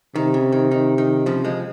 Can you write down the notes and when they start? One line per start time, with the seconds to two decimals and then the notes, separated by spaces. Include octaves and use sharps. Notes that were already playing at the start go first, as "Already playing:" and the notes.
0.15 C3 D#3
0.34 C#3
0.52 D#3
0.71 D#3
0.98 D#3
1.26 C#3 F3
1.45 F3 G#3